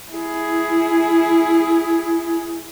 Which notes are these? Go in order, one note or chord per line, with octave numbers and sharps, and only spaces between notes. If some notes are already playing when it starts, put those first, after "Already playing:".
E4 G#4